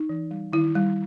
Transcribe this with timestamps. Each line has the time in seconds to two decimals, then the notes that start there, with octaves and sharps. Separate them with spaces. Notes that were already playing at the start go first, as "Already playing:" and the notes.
Already playing: D#4
0.09 E3
0.31 G3
0.53 D#3 E4
0.75 G3